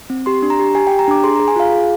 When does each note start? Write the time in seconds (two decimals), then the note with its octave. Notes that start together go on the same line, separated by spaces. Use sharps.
0.10 C4
0.26 G4 C6
0.42 D4
0.50 A#5
0.59 G4
0.75 G4 G#5
0.87 G5
0.92 G4
0.99 A#5
1.08 D4 D6
1.24 G#4 C6
1.36 A#5
1.40 G#4
1.48 G#5
1.56 F4 F5
1.73 G#4